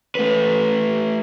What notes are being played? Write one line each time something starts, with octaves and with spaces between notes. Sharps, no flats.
A3 B4